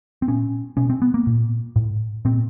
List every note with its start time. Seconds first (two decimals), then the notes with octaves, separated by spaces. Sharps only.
0.22 C4
0.28 A#2 C#4
0.77 B2 C#4
0.90 C4
1.02 B3
1.14 A#3
1.27 A#2
1.76 A2
2.25 A#2 C4